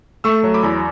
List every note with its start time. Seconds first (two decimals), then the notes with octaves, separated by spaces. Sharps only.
0.24 A3 C#6 E6
0.43 F#3
0.54 B5 D6
0.63 E2